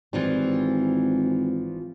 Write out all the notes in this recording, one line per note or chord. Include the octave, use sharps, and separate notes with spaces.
G#1 E3 F3 G3